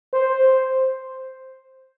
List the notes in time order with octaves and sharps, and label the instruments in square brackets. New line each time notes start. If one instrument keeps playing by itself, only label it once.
[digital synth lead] C5